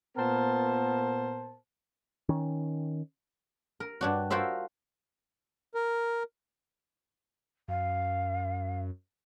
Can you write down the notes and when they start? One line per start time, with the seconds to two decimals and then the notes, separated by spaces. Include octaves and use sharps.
0.17 A#2 B3 A#4 C5 A5
2.29 D#3 C#4
3.80 A#4
4.01 G2 D4 F#4
4.30 F4 F#4 A#4 C5 E5
5.75 A#4
7.68 F#2 F5